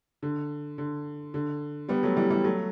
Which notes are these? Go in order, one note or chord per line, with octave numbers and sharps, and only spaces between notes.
D3
D3
D3
G3 B3
F#3 A3
E3 G3
E3 G3
F#3 A3